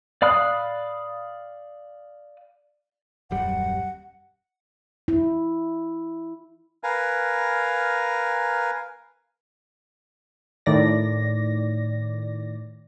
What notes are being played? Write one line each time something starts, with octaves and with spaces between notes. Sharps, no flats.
D5 F5 B5 D#6 F#6
D#1 F#2 G3 F#5
E4
A#4 B4 F5 G#5 A#5
A2 D#3 D5 A#6